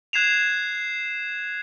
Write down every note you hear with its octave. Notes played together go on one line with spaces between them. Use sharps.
F#6 G#6 C7 E7 F7